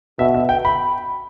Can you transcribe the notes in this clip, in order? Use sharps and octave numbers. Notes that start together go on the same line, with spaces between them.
B2 E5
E5
G5
B5